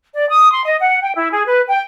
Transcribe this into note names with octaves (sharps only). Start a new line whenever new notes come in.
D5
D#6
C6
D#5
F#5
G5
E4
G#4
B4
G5